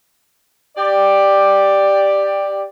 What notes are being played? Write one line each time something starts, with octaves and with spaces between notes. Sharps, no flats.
G4 D5